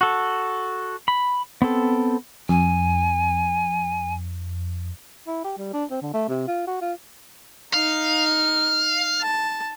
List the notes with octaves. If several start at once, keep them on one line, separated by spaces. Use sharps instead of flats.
F#4 A4
B5
B3 C4 A4
F2 G#5
E4
G4
G3
D4
C4
D3
A3
C3
F4
F#4
F4
D#4 F5
A5